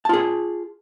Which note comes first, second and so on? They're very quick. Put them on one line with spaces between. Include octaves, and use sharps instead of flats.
A5 F4 G#4